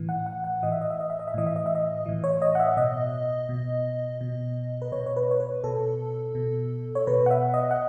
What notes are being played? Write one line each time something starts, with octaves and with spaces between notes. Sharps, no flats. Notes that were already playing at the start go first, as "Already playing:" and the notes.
Already playing: A2 E3
F#5
F#5
F#5
A2 E3 D#5
E5
D#5
E5
D#5
E5
D#5
E5
A2 E3 D#5
E5
D#5
E5
D#5
A2 E3
C#5
D#5
F#5
E5
B2 D#5
B2
B2
B4
B2 C#5
C#5
B4
C#5
B4
B2 A4
B2
C#5
B2 B4
F#5
E5
D#5
F#5